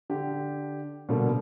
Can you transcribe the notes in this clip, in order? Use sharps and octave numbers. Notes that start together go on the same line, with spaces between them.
D3 G4
B2 D3 G3 A#3 A4